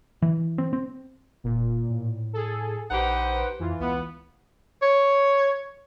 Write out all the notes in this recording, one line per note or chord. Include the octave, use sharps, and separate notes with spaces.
E3
C4
C4
E1 A#2
A2
G#4 A4
A#1 D#4 G4 B4 C5 F#5
F2 E3 F4
C#2 B3
C#5